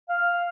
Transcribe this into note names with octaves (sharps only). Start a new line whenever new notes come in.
F5